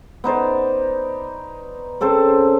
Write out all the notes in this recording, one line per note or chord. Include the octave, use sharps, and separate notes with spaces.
B3 D#4 C5 D5
C#3 C4 A4 C5